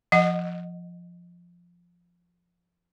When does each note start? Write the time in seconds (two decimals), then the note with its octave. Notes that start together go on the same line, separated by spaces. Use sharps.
0.12 F3 D#5 F#5